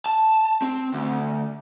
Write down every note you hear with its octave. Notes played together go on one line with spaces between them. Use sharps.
A5
C4
D2